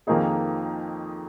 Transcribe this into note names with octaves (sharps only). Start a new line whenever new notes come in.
F2 D#3 A#3 D#4 G#4